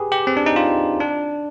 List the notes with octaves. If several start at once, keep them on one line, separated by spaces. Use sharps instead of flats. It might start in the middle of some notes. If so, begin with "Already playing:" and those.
Already playing: G4 G#4 B4
G4
C4
D4
D#4
F4
D4